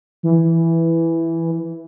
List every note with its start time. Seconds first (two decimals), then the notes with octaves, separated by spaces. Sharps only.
0.23 E3